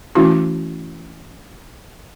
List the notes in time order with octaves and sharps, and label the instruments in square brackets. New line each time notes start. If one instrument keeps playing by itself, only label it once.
[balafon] E3 A3 C#4 E4 F#4